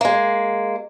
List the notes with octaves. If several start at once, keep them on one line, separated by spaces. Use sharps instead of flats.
G#3 A#3